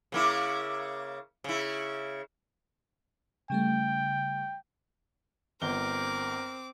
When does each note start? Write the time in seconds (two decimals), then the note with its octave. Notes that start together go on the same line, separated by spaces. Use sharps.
0.12 C#3 A#3 E4
1.44 C#3 E4
3.50 C#3 G3 A3 G5
5.62 G1 C4 A#4 D6 G7